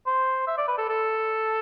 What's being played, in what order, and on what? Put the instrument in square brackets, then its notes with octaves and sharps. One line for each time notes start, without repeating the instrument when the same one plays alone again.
[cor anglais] C5
E5
D5
B4
A4
A4